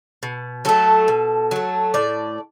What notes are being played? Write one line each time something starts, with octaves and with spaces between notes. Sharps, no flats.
B2
F#3 A3 A4
B2
F#3 A3
A2 D5